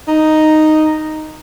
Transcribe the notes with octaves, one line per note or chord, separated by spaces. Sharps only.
D#4